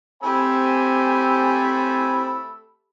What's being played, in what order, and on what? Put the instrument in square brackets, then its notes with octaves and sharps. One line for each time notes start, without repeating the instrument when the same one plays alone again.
[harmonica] A3 B5 E6 [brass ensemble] C4 C5 G#5 [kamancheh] G4